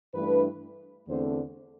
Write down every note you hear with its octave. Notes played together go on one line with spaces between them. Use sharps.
G2 E3 A3 D4 B4
E2 D3 A3 C4 C5